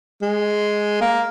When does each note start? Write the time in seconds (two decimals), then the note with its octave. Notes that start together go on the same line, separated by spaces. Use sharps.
0.22 G#3
1.01 A#3